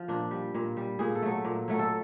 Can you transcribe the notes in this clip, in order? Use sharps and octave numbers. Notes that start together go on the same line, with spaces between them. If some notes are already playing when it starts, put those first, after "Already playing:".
Already playing: F3
A#2 D4
G3
A#2
G3
A#2 G#4
A4
F#3 A3
A#2
F#3 A3
A4